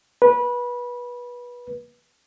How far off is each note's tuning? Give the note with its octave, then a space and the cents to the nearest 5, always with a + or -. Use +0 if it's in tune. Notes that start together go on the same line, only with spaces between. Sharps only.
B4 -20